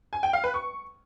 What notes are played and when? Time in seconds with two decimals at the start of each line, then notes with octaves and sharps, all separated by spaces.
0.13 G#5
0.23 G5
0.33 F5
0.44 B4
0.54 C#6